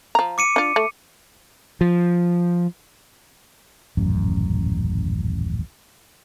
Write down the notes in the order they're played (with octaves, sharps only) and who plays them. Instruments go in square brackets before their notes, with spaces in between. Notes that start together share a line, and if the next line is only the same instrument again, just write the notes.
[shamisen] F3 A#5
[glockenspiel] D6 C#7 D#7
[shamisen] D4 F4
A3
[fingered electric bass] F3
[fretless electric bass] D#1 A1 F#2